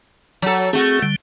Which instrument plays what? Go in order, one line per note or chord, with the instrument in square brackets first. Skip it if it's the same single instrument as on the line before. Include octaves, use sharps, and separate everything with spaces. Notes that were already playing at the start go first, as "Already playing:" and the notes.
[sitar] F#3 A4
[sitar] A3 F#4 [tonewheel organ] C4 G#4
[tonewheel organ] D3 G3